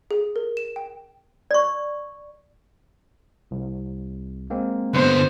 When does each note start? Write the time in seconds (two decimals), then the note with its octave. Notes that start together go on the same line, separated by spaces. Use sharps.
0.11 G#4
0.36 A#4
0.57 E7
0.76 G5
1.51 D5 C#6
3.51 C2
4.50 G#3 A#3 C4
4.94 D3 B3 C5